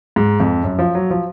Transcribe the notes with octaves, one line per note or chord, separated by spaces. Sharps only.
G#2
F2
F#2
F3
F#3
F3